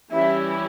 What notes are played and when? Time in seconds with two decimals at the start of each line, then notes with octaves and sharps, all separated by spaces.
0.10 E3 G3 C#4 E4 G4 E5